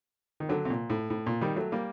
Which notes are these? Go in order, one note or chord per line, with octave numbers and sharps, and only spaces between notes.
D#3
D3 F#3
C3
A#2
A2
A2
A#2
D#3 G3
F#3 A3
G3 A#3